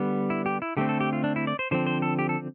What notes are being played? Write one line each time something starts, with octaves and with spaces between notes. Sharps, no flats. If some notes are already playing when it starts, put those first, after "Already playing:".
Already playing: D3 G3 B3
E4
G4
E4
D3 A3 C4 G4
A4
G4
F4
D4
E4
D5
C5
D3 F3 C4 C5
C5
A4
G4
A4